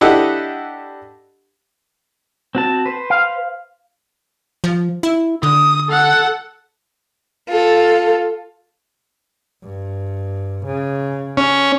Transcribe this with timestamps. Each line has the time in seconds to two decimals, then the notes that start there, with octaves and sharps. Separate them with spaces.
0.01 D4 E4 G4 A4 D#5 F#5
2.55 C4 F#4 A5
2.86 B4 C5
3.10 F5
4.64 F3
5.03 E4
5.43 D3 D#6
5.90 A4 F#5
7.49 F4 A4
9.64 G2
10.66 C#3
11.37 C#4